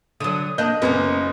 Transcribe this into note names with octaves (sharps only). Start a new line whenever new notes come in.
D3 F#3 D#6
A#3 D4 D#5 F#6 G6
F#1 A#3 B3 C#4 A#4